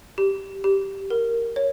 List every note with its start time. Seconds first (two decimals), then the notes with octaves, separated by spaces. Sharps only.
0.18 G4
0.64 G4
1.10 A#4
1.56 C#5